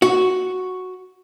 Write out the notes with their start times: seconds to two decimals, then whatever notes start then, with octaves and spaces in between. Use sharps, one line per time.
0.02 F#4